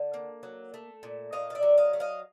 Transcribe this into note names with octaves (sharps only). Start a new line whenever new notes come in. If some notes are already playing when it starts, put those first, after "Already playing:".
Already playing: D3
A#3
F#3
A3
A#2
A#2 D#5 F5
F5
D5 E5
F#3
D#5 F5
A3
D#5 F5